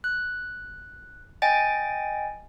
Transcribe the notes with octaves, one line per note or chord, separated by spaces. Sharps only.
F#6
D#5 G5 G#5 A6